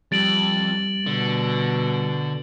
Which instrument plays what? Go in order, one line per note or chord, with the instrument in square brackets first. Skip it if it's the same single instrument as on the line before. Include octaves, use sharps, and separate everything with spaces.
[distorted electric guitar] F2 [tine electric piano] G3 [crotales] A6 D7 F#7
[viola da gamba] B2 [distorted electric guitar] D3